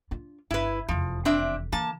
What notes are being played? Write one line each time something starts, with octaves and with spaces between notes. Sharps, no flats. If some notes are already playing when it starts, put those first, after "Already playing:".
D4 F4
G1 E4 B4
F1 E2 F3
C4 D4 E5
D3 E3 A#3 A5